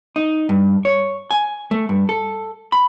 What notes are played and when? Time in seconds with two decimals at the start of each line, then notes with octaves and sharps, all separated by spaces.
0.16 D#4
0.49 G2
0.85 C#5
1.31 G#5
1.71 A3
1.89 G2
2.09 A4
2.72 B5